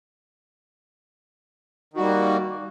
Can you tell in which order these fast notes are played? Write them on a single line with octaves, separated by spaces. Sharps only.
D#3 F#4 G3 A#3